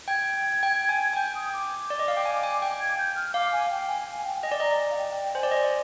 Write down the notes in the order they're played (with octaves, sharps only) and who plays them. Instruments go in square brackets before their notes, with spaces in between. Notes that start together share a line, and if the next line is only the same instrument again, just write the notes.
[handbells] G5 [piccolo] G#6
[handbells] G5
G#5
G#5
[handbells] G5 [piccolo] G6
[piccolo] D#6
D6
[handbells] D5
D#5
F5
G5
G#5
G#5
G5
[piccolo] G#6
G6
F6
[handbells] F5 [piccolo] D6
[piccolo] G#5
G5
G#5
G#5
G5
[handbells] D#5 [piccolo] G#5
[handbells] D5
[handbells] D#5 [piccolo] A#5
[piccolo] F5
G5
G5
[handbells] C5 [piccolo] G#5
[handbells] D5
D#5